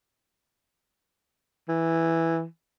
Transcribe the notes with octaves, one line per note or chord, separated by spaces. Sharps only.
E3